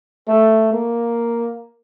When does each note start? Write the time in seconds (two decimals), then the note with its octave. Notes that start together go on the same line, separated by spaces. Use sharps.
0.28 A3
0.73 A#3